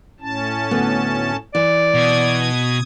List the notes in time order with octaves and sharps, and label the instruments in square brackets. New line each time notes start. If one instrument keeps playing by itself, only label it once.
[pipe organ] A2 C#4 A5
[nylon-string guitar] D2 B3
[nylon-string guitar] E3 [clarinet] D5
[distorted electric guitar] B2 [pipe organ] D#6 G#6